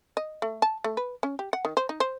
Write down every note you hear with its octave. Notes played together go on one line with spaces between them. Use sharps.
D#5
A3
A5
A3
B4
C#4
G4
F#5
D#3
C5
D#4
C5